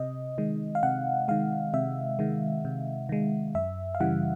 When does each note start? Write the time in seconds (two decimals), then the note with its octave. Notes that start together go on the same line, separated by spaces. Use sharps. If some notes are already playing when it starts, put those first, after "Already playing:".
Already playing: C3 D#5
0.38 D#3 G#3
0.75 F5
0.83 C3 F#5
1.28 D#3 G#3 F5
1.74 C3 E5
2.19 D#3 G#3
2.65 C3
3.09 D#3 G#3
3.55 F#2 E5
3.95 F5
4.00 C#3 E3 G3 F#5